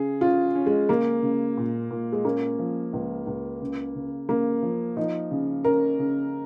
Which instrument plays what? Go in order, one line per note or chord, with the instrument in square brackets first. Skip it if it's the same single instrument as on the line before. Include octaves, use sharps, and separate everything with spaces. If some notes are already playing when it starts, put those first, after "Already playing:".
Already playing: [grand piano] C#3 [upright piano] G#4
[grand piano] C#4 [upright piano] F4
[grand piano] C#4
[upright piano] G#3
[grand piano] C#3 [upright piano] A#3
[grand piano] C#3
A#2
A#2
[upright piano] G#3
[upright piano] A#3 [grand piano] C#4
[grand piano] F3
C#2
C#2
C#3
C#3
[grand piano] C#3 [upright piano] A#3
[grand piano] F3
[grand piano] F3 [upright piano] D#4
[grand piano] C#3
[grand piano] C#4 [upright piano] A#4
[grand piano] C#3